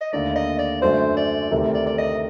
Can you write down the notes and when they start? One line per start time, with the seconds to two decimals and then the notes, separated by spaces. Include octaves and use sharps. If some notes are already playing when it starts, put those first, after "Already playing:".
0.01 D#5
0.13 D#2 D3 A3 D5
0.36 D#5
0.59 D5
0.82 F#2 D3 A3 D4 F#4 C5
1.17 D5
1.51 D2 C3 D#3 A3
1.74 D5
1.86 D5
1.98 D#5